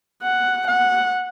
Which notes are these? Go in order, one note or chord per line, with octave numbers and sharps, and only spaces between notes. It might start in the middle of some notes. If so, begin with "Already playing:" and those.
F#5
F#5